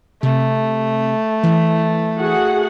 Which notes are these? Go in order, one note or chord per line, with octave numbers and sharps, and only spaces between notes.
C3 A3
E3
F#4 G#4 F#5